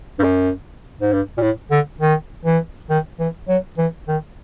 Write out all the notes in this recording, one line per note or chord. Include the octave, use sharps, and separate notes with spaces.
G2
F#2
G#2
G2
A#2
A2
D3
D#3
E3
D#3
E3
F#3
E3
D#3